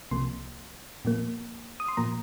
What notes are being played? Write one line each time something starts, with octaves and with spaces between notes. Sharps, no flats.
C2 C3 F3 A#3 C6
A#2 F3 A#3
D#6
C6
A#2 F3 A#3 A#5